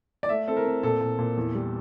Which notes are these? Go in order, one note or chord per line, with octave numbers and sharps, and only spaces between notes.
D5
A3 E5
C4 A4
A#4
C4
A#2 A4
A#2
A#2
E2
G3